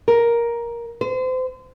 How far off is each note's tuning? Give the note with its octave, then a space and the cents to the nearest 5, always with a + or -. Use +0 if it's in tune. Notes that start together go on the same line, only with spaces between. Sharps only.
A#4 +10
C5 -35